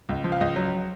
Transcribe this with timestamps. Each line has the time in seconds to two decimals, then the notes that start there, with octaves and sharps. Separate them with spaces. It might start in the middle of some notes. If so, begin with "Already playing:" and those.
0.09 C#2
0.24 F3
0.32 F5
0.40 C#2 D#5
0.56 F#3